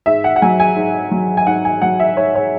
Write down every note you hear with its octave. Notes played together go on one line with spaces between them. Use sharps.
G#2 E5
F#5
F#5
F#3 G#5
G#5
G#2
F#3
G#5
G#2 F#5
G#5
F#3 F#5
E5
G#2 C#5
C#5